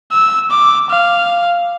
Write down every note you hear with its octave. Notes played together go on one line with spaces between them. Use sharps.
E6
D6
F5